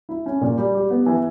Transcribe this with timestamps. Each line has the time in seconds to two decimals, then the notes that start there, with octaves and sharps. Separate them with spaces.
0.09 E4
0.26 C#4
0.41 A#2
0.57 G3
0.75 G4
0.90 B3
1.06 E3